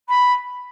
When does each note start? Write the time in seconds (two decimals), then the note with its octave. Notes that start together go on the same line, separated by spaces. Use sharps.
0.08 B5